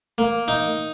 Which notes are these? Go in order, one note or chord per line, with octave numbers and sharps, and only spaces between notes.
A#3
D#4